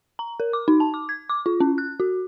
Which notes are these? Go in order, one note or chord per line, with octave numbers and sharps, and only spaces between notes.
A#5
A#4
D6
D#4
A5
D6
G#6
D6
F4
C#4
F#6
F#4